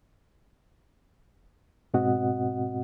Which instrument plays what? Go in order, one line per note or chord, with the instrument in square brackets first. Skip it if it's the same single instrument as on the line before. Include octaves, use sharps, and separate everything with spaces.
[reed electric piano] G#2 B2 C4 F#4 D#5 F#5